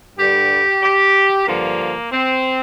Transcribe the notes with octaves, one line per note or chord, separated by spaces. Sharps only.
G2 D3 G3 G4
G4
G2 D3 F3 A#3
C4